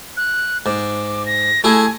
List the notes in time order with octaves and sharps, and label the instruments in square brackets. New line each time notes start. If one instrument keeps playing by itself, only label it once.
[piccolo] F#6
[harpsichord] G#2 [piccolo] D6
[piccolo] A#6
[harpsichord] A3 E4 G#4 [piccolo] G#5